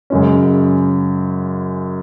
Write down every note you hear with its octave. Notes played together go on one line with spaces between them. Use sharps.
F#2 C#3 G#3 C#4